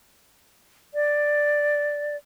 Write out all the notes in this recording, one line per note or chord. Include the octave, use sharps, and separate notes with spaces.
D5